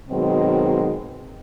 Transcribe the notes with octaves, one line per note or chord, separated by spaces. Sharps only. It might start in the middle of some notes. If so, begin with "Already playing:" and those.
B2 D#3 F#3 G#3 C4